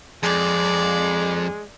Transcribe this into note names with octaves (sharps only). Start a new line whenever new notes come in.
F2 G#3 D5